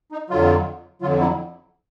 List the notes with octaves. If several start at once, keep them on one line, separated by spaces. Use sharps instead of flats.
D#4
F2 D3 F#3 F4
F2 D3 F#3 F4
E4